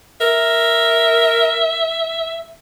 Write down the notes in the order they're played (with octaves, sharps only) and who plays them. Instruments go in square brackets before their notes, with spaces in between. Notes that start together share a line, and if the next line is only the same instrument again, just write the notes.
[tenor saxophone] A#4 [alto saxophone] E5